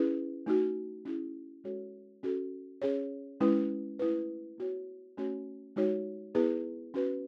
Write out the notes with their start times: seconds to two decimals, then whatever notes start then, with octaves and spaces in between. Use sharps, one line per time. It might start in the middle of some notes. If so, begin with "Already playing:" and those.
Already playing: C#4 E4 G#4 B4
0.46 A3 D#4 F#4
1.05 C#4 E4 G#4
1.64 G#3 C#4 F#4 A4 C#5
2.23 C#4 F#4 A4
2.82 C#4 G#4 C#5
3.41 G#3 C#4 E4 B4
3.99 A3 E4 B4
4.58 B3 F#4 C#5
5.17 A3 C#4 F#4 C#5
5.76 G#3 D#4 F#4 C#5
6.35 B3 E4 G#4 B4
6.94 C#4 F#4 B4